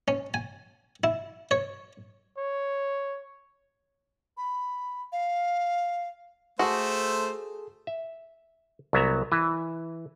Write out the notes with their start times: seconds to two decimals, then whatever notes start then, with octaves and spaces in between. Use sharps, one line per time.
0.08 C#4
0.34 G#5
1.04 E4
1.51 C#5
2.38 C#5
4.37 B5
5.12 F5
6.59 A3 F#4 G#4 A4 C5
7.87 E5
8.93 C2 F#3 B3 E5 A#5
9.32 E3 B4 E5